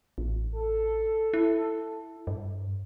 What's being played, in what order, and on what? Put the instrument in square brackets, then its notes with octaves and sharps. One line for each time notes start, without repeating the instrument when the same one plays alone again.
[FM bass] A1
[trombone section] A4
[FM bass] E4
G2